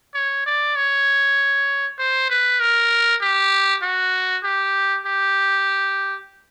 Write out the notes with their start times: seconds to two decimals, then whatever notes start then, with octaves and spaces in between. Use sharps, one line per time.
0.14 C#5
0.46 D5
0.76 C#5
1.99 C5
2.30 B4
2.60 A#4
3.21 G4
3.83 F#4
4.44 G4
5.06 G4